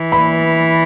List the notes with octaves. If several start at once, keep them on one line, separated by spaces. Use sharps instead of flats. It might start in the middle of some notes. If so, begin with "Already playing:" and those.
Already playing: E3
B5